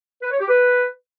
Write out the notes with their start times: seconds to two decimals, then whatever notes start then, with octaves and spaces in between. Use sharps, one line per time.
0.22 B4
0.31 C#5
0.40 G4
0.49 B4